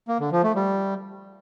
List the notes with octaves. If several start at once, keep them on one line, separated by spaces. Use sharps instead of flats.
A#3
D3
F3
A3
G3